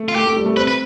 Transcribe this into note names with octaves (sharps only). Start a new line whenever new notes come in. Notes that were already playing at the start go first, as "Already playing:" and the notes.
Already playing: A3
F4
A3 G4
A3
G3
A3
C4 B4
B4